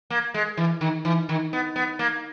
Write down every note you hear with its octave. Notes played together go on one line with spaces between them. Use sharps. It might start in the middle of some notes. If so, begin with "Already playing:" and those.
A#3
G#3
E3
D#3
E3
D#3
B3
B3
A#3